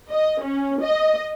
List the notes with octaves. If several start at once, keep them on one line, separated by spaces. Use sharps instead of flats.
D#5
C#4
D#5